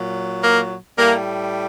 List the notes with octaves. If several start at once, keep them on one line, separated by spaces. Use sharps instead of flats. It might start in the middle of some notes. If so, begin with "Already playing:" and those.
Already playing: A#2 F#3
A#3
A2 G3 A#3